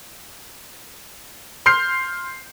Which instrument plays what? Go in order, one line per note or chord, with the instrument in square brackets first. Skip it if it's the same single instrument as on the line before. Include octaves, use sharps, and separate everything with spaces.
[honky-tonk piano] C6 F6 G6 C7